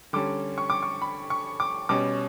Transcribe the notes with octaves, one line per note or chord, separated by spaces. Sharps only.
D3 G3 C#4 D6
C#6
D6
C#6
B5
C#6
D6
B2 G3 C#4 D6